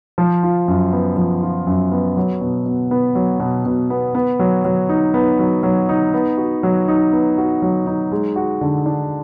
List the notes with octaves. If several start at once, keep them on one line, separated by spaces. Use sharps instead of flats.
F3
F4
F#2
B3
F3
F4
F#2
B3
F#3
B2
B2
B3
F#3
B2
B2
B3
B3
F#3
F#3
D#4
B3
F#3
F#3
D#4
B3
F#4
F#3
D#4
B3
F#4
F#3
D#4
G#3
F#4
D3
D4